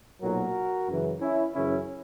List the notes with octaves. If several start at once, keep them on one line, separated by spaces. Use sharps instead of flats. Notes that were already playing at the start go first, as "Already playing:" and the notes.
B1 A#2 F#3 F#4 A#4
F#2 C#3 E3
C#4 E4
F#2 C#3 E3 C#4 E4